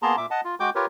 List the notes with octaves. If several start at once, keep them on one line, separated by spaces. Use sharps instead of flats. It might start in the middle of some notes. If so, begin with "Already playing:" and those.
A#3 B3 G#4 A5 A#5 C6
A#2 E5 D6
D#5 F#5 A5
F4
G#3 F#4 G5 D6 G6
F4 G4 A#4 B4 C#5